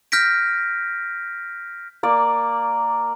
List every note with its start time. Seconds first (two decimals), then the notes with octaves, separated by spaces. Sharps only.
0.12 F6 G6 A#6 B6 D7
2.03 A#3 D5